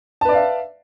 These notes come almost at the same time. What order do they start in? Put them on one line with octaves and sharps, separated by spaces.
A5 B4 D5 F5 E5